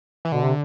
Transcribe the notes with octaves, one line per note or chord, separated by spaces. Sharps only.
E3
B2 D3
C3